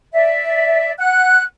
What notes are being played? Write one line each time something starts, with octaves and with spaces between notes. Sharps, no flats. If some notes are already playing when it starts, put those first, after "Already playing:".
D5 E5
F#5 F#6